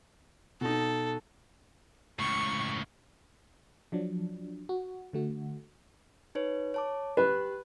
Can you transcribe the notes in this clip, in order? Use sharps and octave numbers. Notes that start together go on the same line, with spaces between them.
B2 D#4 A4
C#2 A2 C#6
F3 F#3 D4
F#4
D3 A3 F#4
D#4 B4 C#5
C#5 A5 D6
G4 B4 F#6